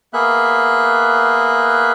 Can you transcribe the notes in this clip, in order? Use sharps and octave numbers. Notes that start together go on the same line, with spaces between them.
A#3 B3 G#4 E5 F#6